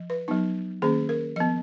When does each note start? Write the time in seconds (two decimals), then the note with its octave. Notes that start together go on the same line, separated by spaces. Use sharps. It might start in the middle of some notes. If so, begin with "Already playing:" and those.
Already playing: F3
0.10 B4
0.28 F#3 B3 D#4
0.82 D#3 A#3 C#4 G#4
1.09 A#4
1.36 F3 B3 D#5